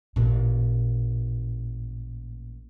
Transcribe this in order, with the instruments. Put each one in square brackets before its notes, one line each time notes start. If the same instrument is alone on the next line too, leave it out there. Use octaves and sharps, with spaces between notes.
[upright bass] A1 A#2